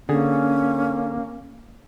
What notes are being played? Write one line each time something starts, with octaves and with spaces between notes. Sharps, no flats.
D3 A#3 C#4 G#4